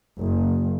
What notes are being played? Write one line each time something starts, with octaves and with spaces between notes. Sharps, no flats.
F#1